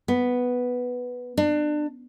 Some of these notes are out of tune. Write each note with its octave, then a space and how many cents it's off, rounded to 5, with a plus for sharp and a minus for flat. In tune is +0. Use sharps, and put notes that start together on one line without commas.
B3 +0
D4 +30